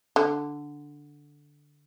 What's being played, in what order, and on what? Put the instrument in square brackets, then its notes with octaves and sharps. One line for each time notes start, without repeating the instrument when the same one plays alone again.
[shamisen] D3